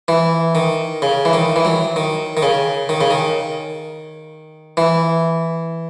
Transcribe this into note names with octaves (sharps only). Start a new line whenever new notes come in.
E3
D#3
C#3
E3
D#3
E3
F#3
D#3
D#3
C#3
D#3
C#3
D#3
E3